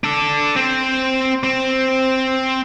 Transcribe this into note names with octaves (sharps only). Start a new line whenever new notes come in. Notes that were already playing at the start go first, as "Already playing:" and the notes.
D4 A4
C4 C5
C4